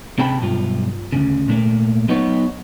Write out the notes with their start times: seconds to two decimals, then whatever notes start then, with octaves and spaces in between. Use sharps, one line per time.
0.18 C3 C4 G#4 G5 A5 B5
0.40 B1 G2 F4
1.12 D2 G#2 C#3
1.48 A#2 A3 A#3
2.08 F#3 B3 D#4 F#4 B4 C#5